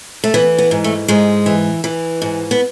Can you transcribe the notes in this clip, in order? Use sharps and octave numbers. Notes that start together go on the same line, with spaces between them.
A3
E3 B3
B3
G#2
A3
G#2 G#3
E3
E3
G#2
B3